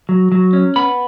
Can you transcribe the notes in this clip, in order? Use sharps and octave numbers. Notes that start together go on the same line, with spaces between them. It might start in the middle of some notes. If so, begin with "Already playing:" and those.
F#3
F#3
C#4
B3 B5